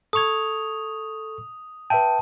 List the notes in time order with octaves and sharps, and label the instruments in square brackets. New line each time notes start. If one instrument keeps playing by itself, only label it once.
[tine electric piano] A4 C#6 G#6 [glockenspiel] D#6 F7
[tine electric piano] B4 E5 G5 [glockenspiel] A5